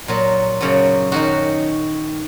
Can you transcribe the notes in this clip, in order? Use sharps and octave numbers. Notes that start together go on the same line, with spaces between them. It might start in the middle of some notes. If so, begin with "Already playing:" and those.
A#2 F#3
F#2 C#3 F#3
F#2 D#3 F#3 F#4